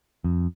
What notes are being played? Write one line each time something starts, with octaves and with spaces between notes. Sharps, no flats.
F2